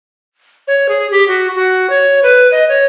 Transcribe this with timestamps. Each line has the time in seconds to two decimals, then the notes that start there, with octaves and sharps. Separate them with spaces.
0.68 C#5
0.89 G#4
1.11 G4
1.28 F#4
1.55 F#4
1.90 C#5
2.23 B4
2.52 D#5
2.69 C#5